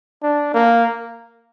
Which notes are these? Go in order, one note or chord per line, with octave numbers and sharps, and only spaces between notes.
D4
A#3